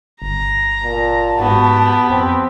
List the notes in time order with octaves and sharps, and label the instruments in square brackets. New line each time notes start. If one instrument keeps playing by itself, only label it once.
[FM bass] G1 [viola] A#5
[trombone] A#2 [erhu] A5
[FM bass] G#2 [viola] B3 G4 [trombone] F#4
[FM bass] F2 [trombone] C4